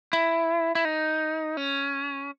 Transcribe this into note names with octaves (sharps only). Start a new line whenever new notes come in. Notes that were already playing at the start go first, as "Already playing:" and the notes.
E4
E4
D#4
C#4